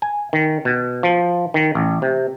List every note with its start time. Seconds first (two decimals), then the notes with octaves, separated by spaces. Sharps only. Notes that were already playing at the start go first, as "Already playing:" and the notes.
0.02 G#5
0.33 D#3
0.65 B2
1.03 F3
1.54 D#3
1.75 A1
2.02 C3